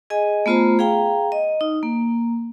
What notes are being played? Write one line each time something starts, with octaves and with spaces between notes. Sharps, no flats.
G#4 D#5 G#5
A3 B3 F4 C5 A#5
G#4 F5 G5 A#5
D#5
D#4
A#3